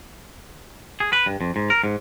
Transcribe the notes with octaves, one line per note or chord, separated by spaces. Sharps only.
G#4
B4
G2
F2
G#2
A#4
G#2